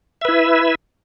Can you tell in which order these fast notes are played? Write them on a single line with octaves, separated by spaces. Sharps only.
E5 B4 E4